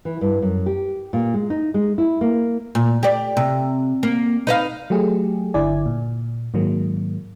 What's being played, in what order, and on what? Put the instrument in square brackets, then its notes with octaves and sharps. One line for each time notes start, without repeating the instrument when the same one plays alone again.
[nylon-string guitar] E3
G2
F#2
G4
A#2
G#3
D#4
G#3
E4
A#3
[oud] A#2
G4 D5
C3
A#3
D#4 B4 F5
[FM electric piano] F#3 A3 G4 G#4
G1 D3 E4 D5 G#5
A#2
G#2 D#3 F#3 G#3 A#3